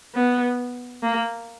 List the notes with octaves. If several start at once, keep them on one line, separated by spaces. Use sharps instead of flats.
B3
A#3